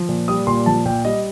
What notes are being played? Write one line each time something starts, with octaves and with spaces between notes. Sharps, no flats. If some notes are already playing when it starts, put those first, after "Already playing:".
Already playing: F3
A#2
G3 D#6
A#2 C6
F3 A5
A#2 G5
G3 D#5